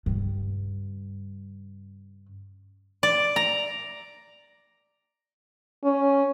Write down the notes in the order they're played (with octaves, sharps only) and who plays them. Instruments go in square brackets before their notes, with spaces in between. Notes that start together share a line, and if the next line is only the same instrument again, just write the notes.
[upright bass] G2 C#3
[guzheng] D5
A#5
[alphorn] C#4